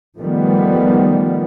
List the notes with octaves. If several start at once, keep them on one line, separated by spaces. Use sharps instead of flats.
D#3 F3 G3 A3 B3